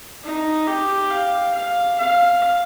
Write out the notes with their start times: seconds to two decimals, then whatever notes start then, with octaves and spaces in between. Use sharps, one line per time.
0.24 D#4
0.67 G4
1.11 F5
1.55 F5
1.98 F5